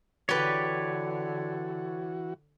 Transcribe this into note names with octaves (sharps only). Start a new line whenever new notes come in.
D3 E3 F#4 G4 B4 C#5 D5